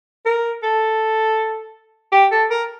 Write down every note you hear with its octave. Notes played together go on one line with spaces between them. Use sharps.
A#4
A4
G4
A4
A#4